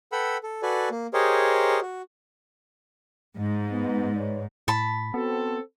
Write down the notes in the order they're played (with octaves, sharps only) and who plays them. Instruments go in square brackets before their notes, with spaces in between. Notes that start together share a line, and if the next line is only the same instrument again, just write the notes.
[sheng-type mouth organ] A4 B4 F#5 G5 B5 E6
A4
F#4 A4 B4 D5 G#5
A#3
G4 G#4 A#4 C5 C#5 D#5
F#4
[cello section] G#2
[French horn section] B3
B4 C#5 D5
[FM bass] A2 [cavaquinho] A5 B5
[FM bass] B3 [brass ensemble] C4 F#4 A4